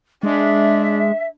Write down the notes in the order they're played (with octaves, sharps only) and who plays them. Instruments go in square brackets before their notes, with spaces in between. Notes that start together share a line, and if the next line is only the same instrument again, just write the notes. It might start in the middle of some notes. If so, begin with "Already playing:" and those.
[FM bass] G#3 [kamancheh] D4 [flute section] E5